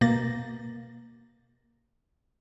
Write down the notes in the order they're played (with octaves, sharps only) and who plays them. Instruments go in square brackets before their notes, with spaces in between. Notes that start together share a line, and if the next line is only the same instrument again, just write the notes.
[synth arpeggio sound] B2 A#3 A6 A#6